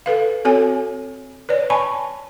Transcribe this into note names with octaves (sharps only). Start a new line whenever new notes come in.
A4 B4 F5
C4 F#4 A4 C#5 G#5
B4 C#5 D5
G#5 A5 B5 C#6